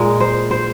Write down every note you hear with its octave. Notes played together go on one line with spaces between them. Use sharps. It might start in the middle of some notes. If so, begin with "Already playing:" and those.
Already playing: A#2 G#3 A#4
C5
C5